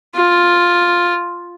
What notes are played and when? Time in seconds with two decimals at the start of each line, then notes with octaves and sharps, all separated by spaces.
0.15 F4